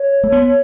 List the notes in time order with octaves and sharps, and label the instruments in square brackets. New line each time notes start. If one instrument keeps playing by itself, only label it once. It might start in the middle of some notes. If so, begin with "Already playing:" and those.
Already playing: [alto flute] C#5
[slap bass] A3
B3